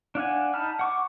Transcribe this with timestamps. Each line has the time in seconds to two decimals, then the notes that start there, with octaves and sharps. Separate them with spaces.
0.15 D4 F5 F#5 G#5
0.54 D#4 A5 B5 F6
0.79 F#5 C#6 D6